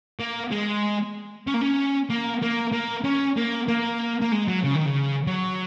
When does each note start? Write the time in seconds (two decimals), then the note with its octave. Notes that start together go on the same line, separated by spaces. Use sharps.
0.20 A#3
0.51 G#3
1.47 C#4
1.54 A#3
1.61 C#4
2.10 A#3
2.42 A#3
2.73 A#3
3.05 C#4
3.37 A#3
3.68 A#3
4.22 A#3
4.32 G#3
4.48 F#3
4.64 C#3
4.76 D#3
4.86 C#3
5.27 F#3